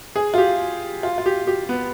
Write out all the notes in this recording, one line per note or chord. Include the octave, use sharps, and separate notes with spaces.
G#4
F4
G4
F4
F4
G4
G4
B3